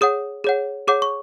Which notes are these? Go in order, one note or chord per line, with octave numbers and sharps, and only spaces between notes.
G#4 C#5 F#5 D#6
G#4 C#5 F#5
G#4 C#5 F#5 D6
C#6